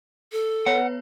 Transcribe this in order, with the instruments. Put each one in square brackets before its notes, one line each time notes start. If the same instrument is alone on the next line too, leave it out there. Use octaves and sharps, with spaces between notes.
[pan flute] A4
[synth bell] B3 B4 C#5 [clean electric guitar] F#5